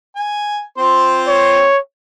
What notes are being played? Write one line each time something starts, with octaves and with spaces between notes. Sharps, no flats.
G#5
C4 F4 C5
C#5